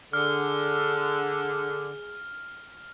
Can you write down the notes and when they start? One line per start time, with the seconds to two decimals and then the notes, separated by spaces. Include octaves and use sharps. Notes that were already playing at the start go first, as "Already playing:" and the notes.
0.13 D3 G#4 F6